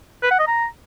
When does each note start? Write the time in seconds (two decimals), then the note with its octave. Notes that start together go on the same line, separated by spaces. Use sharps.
0.23 B4
0.31 F#5
0.39 D#5
0.47 A#5